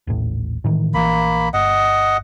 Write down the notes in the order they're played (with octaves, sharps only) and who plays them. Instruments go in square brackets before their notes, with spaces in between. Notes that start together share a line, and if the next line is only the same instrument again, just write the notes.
[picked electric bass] D#1 A1 A2
A2 D#3 E3
[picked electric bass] A#1 E3 [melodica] A#3 B5
[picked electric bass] G1 [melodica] D#5 F#5